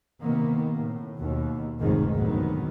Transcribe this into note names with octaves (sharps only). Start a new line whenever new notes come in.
C3 D#3 A#3 B3
A2
D#2 B2
F1 C#2 G#2 D#3 G#3
D2 A2 C3 D#3 F#3 B3